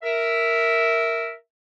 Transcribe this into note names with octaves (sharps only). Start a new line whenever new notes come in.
A#4 E5